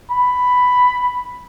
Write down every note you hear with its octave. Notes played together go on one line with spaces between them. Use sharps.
B5